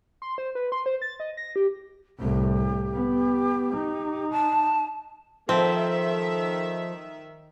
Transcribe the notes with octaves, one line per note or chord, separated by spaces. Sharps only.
C6
C5
B4
C6
C5
A6
D#5
A#6
G4
C2 A2 G4
B3
D#4
A5
D#3 F3 C4 A4 E5